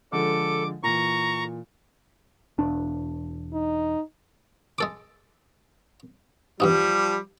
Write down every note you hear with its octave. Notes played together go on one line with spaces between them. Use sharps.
D3 F3 G#3 A4 D6
A#2 E3 A#5 C#6
E1 D4
D#4
G#3 A4 D6
E2 G2 F3 G3 D#4